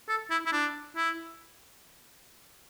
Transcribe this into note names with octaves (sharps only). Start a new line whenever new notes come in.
A4
E4
E4
D4
E4